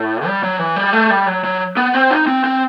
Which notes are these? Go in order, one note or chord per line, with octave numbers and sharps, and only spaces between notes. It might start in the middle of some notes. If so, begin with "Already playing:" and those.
Already playing: A2
G3
F#3
E3
G3
A3
G3
F#3
F#3
B3
C4
D#4
C4
C4